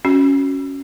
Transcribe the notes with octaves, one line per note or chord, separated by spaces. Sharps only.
C#4 F#4